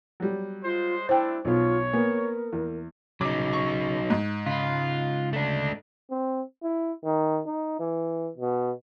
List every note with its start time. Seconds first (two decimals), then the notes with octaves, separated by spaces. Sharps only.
0.20 F#3 G3
0.64 G#3 F4 C5
1.09 A3 C4 D4 E4 C5 G5
1.45 B1 B2 F4 C#5
1.93 A#3 B3 A#4
2.53 E2
3.21 C#3 F#3 D#4 D6
3.53 C#6
4.10 G#2
4.47 C#3 F4 B5
5.33 A3 D4
6.11 C4
6.63 E4
7.04 D#3
7.46 D#4
7.80 E3
8.37 B2